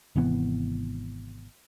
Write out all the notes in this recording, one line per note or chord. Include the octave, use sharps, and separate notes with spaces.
G#1 C3 E3 B3